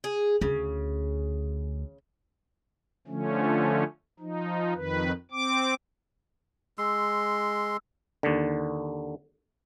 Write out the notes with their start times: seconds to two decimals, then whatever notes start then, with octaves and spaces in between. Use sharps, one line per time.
0.04 G#4
0.41 D2 C#3
3.08 D3 F3 A3 C#4
4.20 F3 D#4
4.75 F2 D#3 B4
5.31 C4 D6
6.78 G#3 C6 E6
8.23 D#2 D3